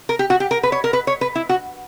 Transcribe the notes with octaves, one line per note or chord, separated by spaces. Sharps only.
A#4
G4
F#4
G4
A#4
B4
C#5
A#4
B4
C#5
B4
E4
F#4